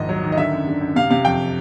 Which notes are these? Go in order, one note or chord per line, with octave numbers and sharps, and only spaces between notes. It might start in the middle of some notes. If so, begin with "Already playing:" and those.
Already playing: A#1 D#2 G#2 D#5
F#3
D#3
D#5
D3 E5
F#2
D3
F#2
C3 F5
C3 F5
F2 G5